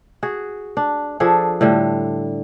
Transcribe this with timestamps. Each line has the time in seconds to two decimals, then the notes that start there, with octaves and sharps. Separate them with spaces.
0.23 F#4 G#4
0.77 D4
1.20 F3 D4 G#4 A4
1.61 A2 D3 G3